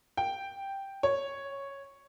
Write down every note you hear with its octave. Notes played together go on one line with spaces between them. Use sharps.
G5
C#5